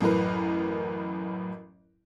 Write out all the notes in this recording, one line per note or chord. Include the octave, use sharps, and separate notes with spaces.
A1 F#2 A2 A#4 B4